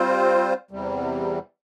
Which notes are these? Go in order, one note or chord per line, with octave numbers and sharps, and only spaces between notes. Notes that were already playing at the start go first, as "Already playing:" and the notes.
Already playing: G3 C4 F4 C5
E2 C3 G3